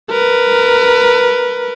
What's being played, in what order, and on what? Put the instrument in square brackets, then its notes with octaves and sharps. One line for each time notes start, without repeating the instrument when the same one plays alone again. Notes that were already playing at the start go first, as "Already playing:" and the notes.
[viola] A#4 B4